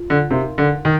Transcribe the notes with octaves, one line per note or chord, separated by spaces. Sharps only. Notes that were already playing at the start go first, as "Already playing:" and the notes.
Already playing: F4
D3
C3 D#4 A#4 F5 C6
D3
D#3